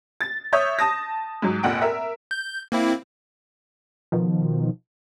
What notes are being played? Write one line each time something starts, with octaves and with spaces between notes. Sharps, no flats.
A6
C#5 E5 D#6 G6
A5 D#6 A#6
G#2 F#3
F1 A#2 F#5 G5 D7
A#4 E5
G6
A#3 C4 E4
B2 D#3 F3